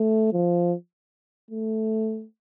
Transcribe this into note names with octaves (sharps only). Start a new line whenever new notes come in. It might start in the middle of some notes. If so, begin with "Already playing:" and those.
Already playing: A3
F3
A3